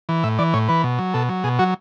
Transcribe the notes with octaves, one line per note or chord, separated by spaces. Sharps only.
E3
A2 E5
E3 D5
A2 C#5
E3 B4
B2
F#3
B2 A4
F#3
B2 G#4
F#3 F#4